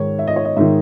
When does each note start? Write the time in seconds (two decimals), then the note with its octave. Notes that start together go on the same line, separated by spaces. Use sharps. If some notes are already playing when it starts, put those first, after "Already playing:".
Already playing: G#2 D#3 C#5
0.19 E5
0.27 D#5
0.36 C#5
0.45 D#5
0.56 G#2 D#3 E5